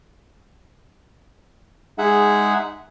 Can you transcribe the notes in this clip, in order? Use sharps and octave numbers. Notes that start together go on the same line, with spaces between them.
G#3 D#4 G#4 E5 F#5